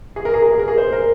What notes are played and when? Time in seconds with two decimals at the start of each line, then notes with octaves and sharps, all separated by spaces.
0.16 G#4
0.25 A#4
0.34 G#4
0.42 A#4
0.51 G#4
0.60 A#4
0.68 G#4
0.78 C5
0.93 A#4